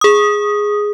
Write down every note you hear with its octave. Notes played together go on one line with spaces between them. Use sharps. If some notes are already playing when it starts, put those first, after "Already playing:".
G#4 D#6